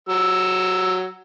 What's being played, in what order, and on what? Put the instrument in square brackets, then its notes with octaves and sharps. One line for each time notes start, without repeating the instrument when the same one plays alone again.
[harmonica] F#3 E6